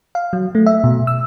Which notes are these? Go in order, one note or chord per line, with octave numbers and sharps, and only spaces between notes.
F5
F#3
A3
E5
B2
E6